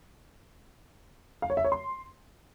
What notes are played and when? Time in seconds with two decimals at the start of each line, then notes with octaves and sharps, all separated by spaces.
1.42 F5
1.50 C#5
1.57 E5
1.64 C#5
1.72 C6